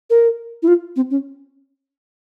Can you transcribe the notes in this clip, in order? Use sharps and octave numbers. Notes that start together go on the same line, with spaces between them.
A#4
E4
F4
C4
C#4